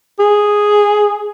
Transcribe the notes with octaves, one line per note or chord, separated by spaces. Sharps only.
G#4